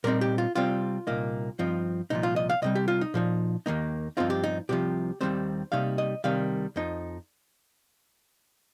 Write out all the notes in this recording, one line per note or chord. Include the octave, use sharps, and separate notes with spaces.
A#2 G3 C4 D#4 A#4
G4
F4
C3 G3 C4 F4
C2 A#2 A#3 D#4
G2 F3 C4 D#4
C2 A#2 F3 D#4
F4
D#5
F5
C2 C3 G3 D#5
G4
F4
D#4
A#2 F3 D#4
D#2 D#3 A#3 D#4
G2 F3 C4 D#4 F4
G4
D#4
C2 C3 F3 G4
D#2 D#3 G3 C4 C5
C3 G3 A#3 D#4 F5
D#5
C2 C3 D#3 G3 F5
F2 F3 D#4